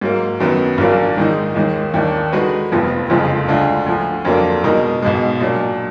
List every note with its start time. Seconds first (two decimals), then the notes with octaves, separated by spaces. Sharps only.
0.01 G#2 F#3 A#3
0.40 F#2 D#3 F#3 B3
0.78 A#1 A#2 F#3 A#3 D4
1.17 G#2 D#3 G#3 D#4
1.55 D#2 D#3 G#3
1.94 D#2 D#3 A#3 D4
2.32 D3 G#3 D#4 F#4 B4
2.72 F1 F2 F3 B3
3.10 F#1 F2 D3 F3 G#3
3.48 D2 D3 G#3 D4 F4
3.86 D2 D3 F3
4.25 F2 D3 F#3 A#3 D4
4.64 B2 G#3 D#4 A#4
5.02 B1 B2 G#3
5.40 A#2 F#3 D4